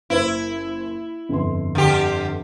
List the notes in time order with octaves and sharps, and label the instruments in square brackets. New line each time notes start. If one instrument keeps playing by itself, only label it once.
[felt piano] F#1 C5 [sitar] E4
[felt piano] G1 F2 C6
[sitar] D3 G4